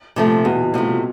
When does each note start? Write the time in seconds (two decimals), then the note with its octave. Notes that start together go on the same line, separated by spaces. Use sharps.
0.16 C3 F3 A3
0.26 A#2
0.45 E2 B2
0.64 B2
0.74 C3 F3 A3
0.83 B2